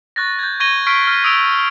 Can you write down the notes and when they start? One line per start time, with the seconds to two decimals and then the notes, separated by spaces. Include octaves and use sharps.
0.16 C#6 F#6 A6 A#6
0.39 G6 G#6
0.60 C#6 G#6 A#6 D#7 G7
0.87 C#6 F6 B6 C7 D7
1.07 F6
1.24 D#6 E6 D7 F7